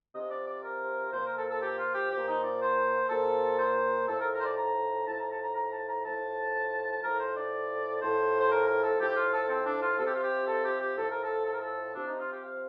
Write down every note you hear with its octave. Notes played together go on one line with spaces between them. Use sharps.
C3 F3 D#5
D5
D5
A#4
A#2 F3 C5
A#4
A4
A4
G4
F4
G4
A#2 F3 G4
D#4
D5
C5
A#2 F3 A4
C5
A2 F3 A4
A#4
A#4
C5
D5
A#5
A2 F3 A5
A#5
A5
A#5
A#5
A5
A#5
A2 F3 A5
A2 F3 A#4
C5
D5
A2 F3 C5
C5
A#4
A#4
A4
A2 F3 G4
F4
A4
C4
D4
F4
C3 F3 A4
G4
F4
G4
A4
G4
G4
A2 F3 A4
A#4
A4
A4
A#4
A4
C3 F3 D4
D#4
F4
G4
F5